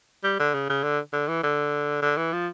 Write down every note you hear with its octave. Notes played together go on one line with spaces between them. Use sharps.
G3
D3
C#3
C#3
D3
D3
E3
D3
D3
E3
F3